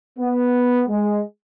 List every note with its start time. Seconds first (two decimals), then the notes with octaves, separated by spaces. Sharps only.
0.19 B3
0.89 G#3